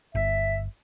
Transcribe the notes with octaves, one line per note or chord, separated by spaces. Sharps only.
G1 E5